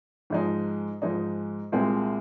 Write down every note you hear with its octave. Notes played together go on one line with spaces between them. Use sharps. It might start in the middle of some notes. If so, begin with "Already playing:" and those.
G#2 F3 G#3 D#4
G#2 F3 G#3 D#4
C2 A#2 G#3 C4